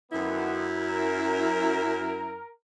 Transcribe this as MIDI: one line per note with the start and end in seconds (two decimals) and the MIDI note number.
0.12 2.39 42
0.12 0.67 50
0.12 0.67 51
0.12 0.67 59
0.12 2.39 64
0.77 2.52 70